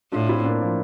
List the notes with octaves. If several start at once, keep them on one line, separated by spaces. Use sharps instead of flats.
A2 D4 F4
C4 E4
A#3 D4
F3